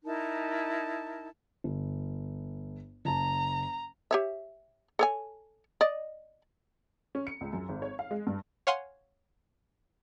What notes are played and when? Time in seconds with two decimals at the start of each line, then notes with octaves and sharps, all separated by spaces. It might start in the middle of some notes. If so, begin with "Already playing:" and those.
0.05 D#4 E4 A#4 A5
1.64 G1
3.05 F#1 A5 A#5
4.11 G4 C#5 E5
4.99 A4 C#5 G#5
5.81 D5 D#5
7.15 C#4
7.27 C#7
7.41 C#2
7.53 F#2
7.69 G#1
7.82 C#5
7.99 F5
8.11 G#3
8.27 G2
8.67 C#5 F5 F#5 G#5 C6